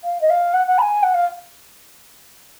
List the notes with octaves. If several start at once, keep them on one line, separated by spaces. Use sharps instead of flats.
F5
D#5
F5
F#5
F#5
B5
G#5
F#5
F5